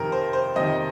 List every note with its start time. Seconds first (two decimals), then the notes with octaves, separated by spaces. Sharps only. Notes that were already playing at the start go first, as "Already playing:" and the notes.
Already playing: F2 C3 D#3 A#4
0.12 C5
0.33 C5
0.56 F2 C3 D#3 D#5